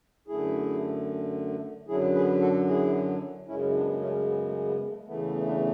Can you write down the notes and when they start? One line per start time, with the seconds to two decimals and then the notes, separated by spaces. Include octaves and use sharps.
0.28 F#2 D3 A3 E4 G#4
1.88 F#2 D3 F#3 E4 G#4
2.14 G#4 B4
2.40 F#4 A4
2.68 E4 G#4
3.47 F#2 C#3 G#3 C#4 E4
3.69 E4
3.74 B3 D4
4.00 A3 C#4
4.27 B3
4.48 A3
4.67 B3
4.88 A3
5.07 E2 C#3 E3 A3 B3
5.26 B3
5.46 B3 D4